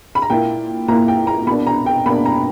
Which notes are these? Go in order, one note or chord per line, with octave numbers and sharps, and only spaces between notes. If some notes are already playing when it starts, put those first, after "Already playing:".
B5
A#5
A#2 A#3 E4 G5
A#2 A#3 E4 A#5
G5
A#5
B2 A#3 D4 B5
A#5
G5
B2 A#3 D4 B5
A#5